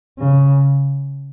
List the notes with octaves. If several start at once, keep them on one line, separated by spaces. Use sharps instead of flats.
C#3